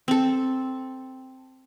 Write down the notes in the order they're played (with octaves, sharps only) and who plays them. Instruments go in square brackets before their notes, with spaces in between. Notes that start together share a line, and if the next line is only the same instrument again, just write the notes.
[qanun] C4 A4